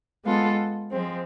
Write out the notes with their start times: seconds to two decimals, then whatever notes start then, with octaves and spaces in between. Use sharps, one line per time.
0.24 G#3 B3 F4 A4
0.90 F3 G#3 C4